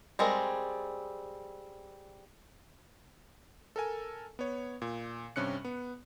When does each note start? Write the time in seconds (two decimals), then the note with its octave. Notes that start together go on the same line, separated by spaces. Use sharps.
0.19 G3 G#3 C4 G#4 A#4
3.76 A4 A#4 G#5
4.39 B3 C#5
4.82 A#2
5.36 G2 C3 C#4 F#6 C#7
5.65 B3